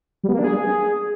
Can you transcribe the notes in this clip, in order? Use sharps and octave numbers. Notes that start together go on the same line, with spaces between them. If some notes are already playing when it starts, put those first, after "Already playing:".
G3
B3
A#3
D4
G#4